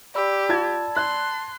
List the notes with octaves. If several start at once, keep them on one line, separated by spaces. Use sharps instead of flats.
G4 D5 B5 E6
F4 A5 G#6
C6 F#6